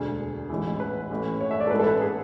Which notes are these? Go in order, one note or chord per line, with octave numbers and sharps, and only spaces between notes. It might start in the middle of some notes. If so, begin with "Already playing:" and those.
Already playing: E1 D2 D3 G#4
A1 G#2 E3
B4
A1 A2 E3
C#5
E5
D5
A4
A1 G#2 E3 B4
A4
B4
G#4